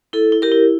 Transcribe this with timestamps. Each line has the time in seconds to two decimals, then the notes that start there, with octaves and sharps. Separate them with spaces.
0.13 E4 A4
0.32 E4
0.42 G4 A#4
0.52 E4